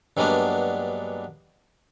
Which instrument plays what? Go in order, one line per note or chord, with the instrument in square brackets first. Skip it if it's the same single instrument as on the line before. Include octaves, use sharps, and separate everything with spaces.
[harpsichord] G2 F#3 G#3 A#3 B3 D4